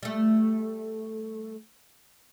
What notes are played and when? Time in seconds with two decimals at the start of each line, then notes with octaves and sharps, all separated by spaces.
0.03 G3 A3